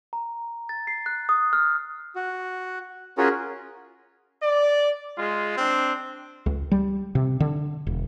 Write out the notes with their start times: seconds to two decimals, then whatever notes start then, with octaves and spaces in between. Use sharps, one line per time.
0.13 A#5
0.69 A6
0.87 C7
1.06 F#6
1.29 D#6
1.53 F6
2.16 F#4
3.18 C#4 F4 F#4 G#4 A#4 C#5
4.43 D5
5.17 G#3 F4
5.57 C4 D4
6.46 C#2
6.72 G3
7.15 C3
7.40 D3
7.87 E1